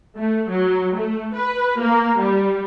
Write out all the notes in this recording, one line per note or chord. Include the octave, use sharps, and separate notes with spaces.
A3
F#3
A3
B4
A#3
G3